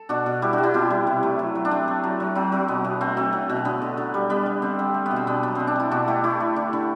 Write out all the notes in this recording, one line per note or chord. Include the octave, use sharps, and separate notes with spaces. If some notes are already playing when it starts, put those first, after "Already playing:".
Already playing: A4
B2 D4 F#4
B2
G3 E4 G4
D4 F#4
G3
E4 G4
B2 C4 E4
G3
C3
A3
F#3
F#3
D4
A3 C4
A3
F#3
F#3
F#3 C4
F#3
B2 B3
B2
A3 C4
F#3 C4
F#3
B2
D3 B3
D3
D3
G3
G3 B3
G3
D3 C4
G3
A3
B3
B2
C4
B2 B3 D4
F#3 B3
B2 C4
D4
A3 E4
B2 D4 F#4
A3 E4 G4
A3 E4 G4
A3
D3
D3